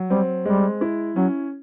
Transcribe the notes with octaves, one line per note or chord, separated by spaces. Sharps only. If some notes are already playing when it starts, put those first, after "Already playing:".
Already playing: F#3
G3 C4
G3 G#3
E4
F#3 C#4